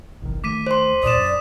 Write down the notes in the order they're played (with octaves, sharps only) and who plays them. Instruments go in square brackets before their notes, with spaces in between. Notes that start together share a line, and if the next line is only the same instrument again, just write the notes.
[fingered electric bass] F#1 B1 D#3
[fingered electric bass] D#2 D#3 A3 [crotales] D6 B6 D#7
[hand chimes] C5 C6
[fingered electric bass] D#2 A#2 [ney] D5 [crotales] D#6 E7
[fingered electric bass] F#2